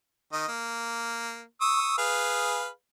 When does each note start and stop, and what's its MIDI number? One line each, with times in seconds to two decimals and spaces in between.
0.33 0.47 51
0.33 0.47 75
0.48 1.43 58
1.61 1.94 85
1.61 1.94 87
1.61 1.94 88
1.98 2.68 68
1.98 2.68 71
1.98 2.68 77